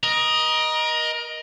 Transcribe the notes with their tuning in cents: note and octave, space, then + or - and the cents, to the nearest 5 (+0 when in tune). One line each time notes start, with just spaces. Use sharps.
A#4 +30 D#5 +0